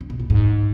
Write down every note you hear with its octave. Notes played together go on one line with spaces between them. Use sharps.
D3
B2
A#2
G#2